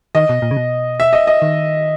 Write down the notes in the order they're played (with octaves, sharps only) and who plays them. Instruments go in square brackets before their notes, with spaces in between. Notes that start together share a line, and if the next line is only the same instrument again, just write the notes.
[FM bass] D#3 [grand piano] D#5
[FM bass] B2
A#2
C#3
B2
[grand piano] E5
D#5
D#5
[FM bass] D#3